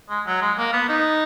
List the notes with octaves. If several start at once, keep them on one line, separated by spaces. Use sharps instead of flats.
G#3
F#3
G#3
A#3
B3
D#4